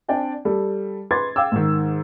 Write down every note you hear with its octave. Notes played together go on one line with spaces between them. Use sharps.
C4 D4 D5 G5 G#5
G3 A4
B4 C6 D6 G#6 A6
F5 G5 D6 E6
G#2 D#3